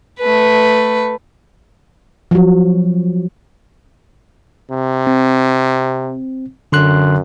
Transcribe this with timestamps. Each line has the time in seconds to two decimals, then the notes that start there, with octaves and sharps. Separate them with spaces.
0.20 A3 B4
2.31 F3 F#3
4.70 C3
5.07 C4
6.72 F#2 D3 C6 F#6